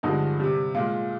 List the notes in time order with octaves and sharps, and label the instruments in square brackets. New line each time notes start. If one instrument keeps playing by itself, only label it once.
[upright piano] G2 D3 F3 G#3 D#4
C3 G3
A#2 G#3 F4